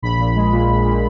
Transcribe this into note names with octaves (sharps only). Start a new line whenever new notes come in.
A#1 B5
A#2
G#3
A#2
A#1
A#2